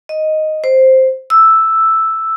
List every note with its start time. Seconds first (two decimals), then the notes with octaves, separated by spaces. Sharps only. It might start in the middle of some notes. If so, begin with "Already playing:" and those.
0.09 D#5
0.64 C5
1.30 E6